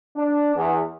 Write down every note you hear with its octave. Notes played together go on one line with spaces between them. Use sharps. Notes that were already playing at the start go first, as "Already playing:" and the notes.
D4
E2